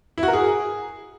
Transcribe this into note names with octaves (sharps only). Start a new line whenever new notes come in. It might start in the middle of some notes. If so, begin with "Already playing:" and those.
E4
F#4
A#4
G#4